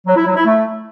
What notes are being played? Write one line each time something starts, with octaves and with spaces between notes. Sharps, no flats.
F#3
E4
F#3
E4
A3